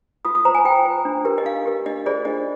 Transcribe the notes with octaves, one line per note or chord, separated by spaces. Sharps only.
F4 D#6
D#6
C5 A#5
G#5
F4 G5
C5
D4
G4 A#4
D#5
D4 F5
G4 A#4
D4 D#5
F4 G#4 C5 D5
D4 D#5